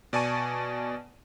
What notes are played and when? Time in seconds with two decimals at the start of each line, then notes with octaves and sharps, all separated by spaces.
0.13 B2 D5 G#5 A5 C#6 D#7